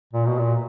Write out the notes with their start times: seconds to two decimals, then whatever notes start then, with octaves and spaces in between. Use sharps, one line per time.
0.13 A#2
0.26 B2
0.39 A#2